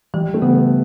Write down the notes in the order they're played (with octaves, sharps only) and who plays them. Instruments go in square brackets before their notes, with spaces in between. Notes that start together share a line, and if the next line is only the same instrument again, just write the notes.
[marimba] E3 [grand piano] G3
[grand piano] A3
[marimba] C#3 [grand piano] B3